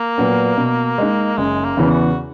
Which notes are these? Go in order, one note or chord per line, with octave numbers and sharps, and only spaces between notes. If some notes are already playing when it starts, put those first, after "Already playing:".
Already playing: A#3
A#2 F#3 B3
B2
G#3 D#4
F#1 G#3
A#3
E2 C#3 E3
F#4